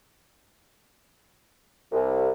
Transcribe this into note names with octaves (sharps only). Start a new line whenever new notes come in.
C2